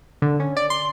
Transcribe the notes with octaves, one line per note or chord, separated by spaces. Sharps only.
D3
C#4
D5
C6